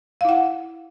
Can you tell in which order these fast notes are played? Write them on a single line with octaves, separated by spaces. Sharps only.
F5 E4 F#5